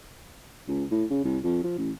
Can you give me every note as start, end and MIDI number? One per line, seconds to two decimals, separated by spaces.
0.68 0.84 37
0.91 1.04 45
1.10 1.24 49
1.24 1.38 36
1.43 1.61 41
1.64 1.76 53
1.78 1.91 33